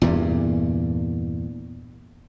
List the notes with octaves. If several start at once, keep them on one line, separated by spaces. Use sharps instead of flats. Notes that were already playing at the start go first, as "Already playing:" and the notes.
E2 G2 A#2